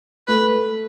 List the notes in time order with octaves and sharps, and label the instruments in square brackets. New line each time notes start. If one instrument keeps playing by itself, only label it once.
[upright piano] A3 [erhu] B4